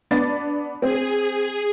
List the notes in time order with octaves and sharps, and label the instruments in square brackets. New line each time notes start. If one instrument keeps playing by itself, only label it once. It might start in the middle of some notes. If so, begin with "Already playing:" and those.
[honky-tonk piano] B3 D4 A6
[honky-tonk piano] C4 [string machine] G#4